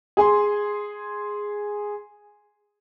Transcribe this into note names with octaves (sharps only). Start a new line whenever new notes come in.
G#4 G#5 C6